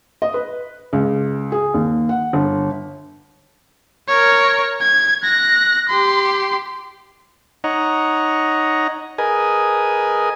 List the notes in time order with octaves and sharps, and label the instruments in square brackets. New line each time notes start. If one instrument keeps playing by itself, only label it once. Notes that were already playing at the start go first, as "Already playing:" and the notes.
[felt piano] D#5
B4
C#2
G#4
D#2
F#5
G1
[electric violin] A#4 C#5
G#6
F#6 A#6
G4 C6
[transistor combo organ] D#4 C#5 D#5 F#5 A#5
G#4 A#4 B4 D#5 G#5